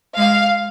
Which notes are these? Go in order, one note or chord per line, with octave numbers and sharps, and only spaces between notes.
G#3 F5